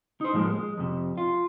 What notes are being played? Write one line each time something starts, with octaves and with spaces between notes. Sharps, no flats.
D#4 C5
A2 F3 G#3 A#3
G#3
F2 C3
F4